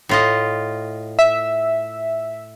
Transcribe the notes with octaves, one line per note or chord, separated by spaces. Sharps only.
A2 F4 D#5
E5